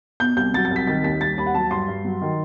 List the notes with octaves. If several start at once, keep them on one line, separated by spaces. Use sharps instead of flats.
B2 G6
C2 G6
F#3 A6
A6
C2
B6
D#3 A6
D#2 B6
G3 A6
D#2 B5
F#5
F#3 A5
G2 C6
G2
F#3
D#3